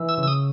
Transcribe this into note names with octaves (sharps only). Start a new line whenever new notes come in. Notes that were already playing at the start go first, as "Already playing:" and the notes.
Already playing: E3
E6
C#3
E6
D#6